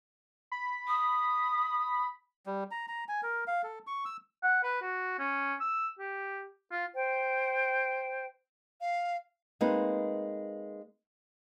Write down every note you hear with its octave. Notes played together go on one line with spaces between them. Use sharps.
B5
D#6
G3
A#5
A#5
G#5
A#4
F5
A4
C#6
E6
F#5
B4
F#4
C#4
E6
G4
F4
C5 G5
F5
G#3 A#3 C4 D#4 B4